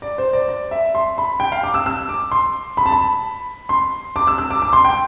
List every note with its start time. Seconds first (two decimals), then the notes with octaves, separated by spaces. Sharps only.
0.02 D5
0.18 C5
0.33 D5
0.49 D5
0.71 E5
0.95 C6
1.18 B5
1.40 G5
1.52 F5
1.63 D6
1.74 E6
1.86 E6
2.09 D6
2.31 C6
2.77 B5
2.86 A5
2.92 B5
3.69 C6
4.16 D6
4.27 E6
4.38 E6
4.51 D6
4.62 D6
4.73 C6
4.85 G5